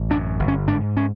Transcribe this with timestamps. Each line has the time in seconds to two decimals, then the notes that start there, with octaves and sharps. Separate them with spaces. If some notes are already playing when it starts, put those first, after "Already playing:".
Already playing: A1
0.10 F#2 D4
0.40 G1
0.48 C#4
0.67 G#2 D4
0.97 C#4